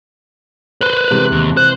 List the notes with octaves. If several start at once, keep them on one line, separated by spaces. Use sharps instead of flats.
B4 C5 F#6
C3 E3 G#3
D#2
C5 F#6